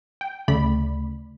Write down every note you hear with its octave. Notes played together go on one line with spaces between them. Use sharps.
G5
D2 C#3 A3 D5 B5